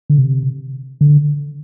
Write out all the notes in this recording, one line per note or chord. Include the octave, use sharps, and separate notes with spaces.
D3
C3
D3